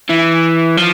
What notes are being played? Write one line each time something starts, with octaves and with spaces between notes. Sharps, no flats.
E3
F3